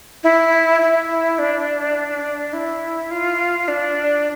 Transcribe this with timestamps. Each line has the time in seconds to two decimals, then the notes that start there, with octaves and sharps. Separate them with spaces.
0.24 E4
0.81 E4
1.39 D4
2.53 E4
3.11 F4
3.68 D4